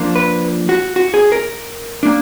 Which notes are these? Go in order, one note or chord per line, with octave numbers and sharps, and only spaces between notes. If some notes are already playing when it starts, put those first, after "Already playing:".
Already playing: F3 A#3 D4
B4
F#4
F#4
G#4
A#4
A#3 D4